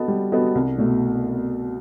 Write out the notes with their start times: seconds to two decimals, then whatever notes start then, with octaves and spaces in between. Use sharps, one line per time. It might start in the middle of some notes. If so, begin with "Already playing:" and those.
Already playing: B3 F#4 A4 D#5
0.08 G3
0.32 B3 F#4 A4 D#5
0.55 C2
0.78 B2 A3